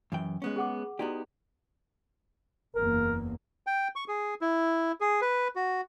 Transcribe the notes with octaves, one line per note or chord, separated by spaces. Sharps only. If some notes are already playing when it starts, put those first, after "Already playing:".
F#2 E3 G5
G#3 B3 C#4
G#4 F#5 D6
B3 D#4 E4 F#4 G4 D5
F#1 E2 A#3 A#4
G5
C#6
G#4
E4
G#4
B4
F#4